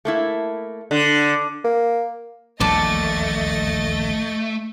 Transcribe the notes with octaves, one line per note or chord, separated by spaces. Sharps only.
A3 A#3 E4
D3
A#3
D#1 A#1 E2 A3 D5 D#5 A5 A6